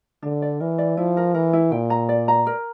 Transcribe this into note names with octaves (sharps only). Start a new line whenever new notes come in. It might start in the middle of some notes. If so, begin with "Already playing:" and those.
D3 D4
D5
E3 A#4
D5
F3 E4
A#4
E3 A#4
E4
A#2 G5
A#5
D5
A#5
A#4